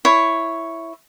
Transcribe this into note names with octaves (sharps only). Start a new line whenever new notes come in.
E4 C#5